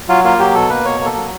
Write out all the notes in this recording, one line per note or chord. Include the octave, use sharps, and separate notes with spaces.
F#3 F4
A#3 F4
F#3 G4
B2 A4
A#3 B4
B2 C#5
A#3 A4
F#3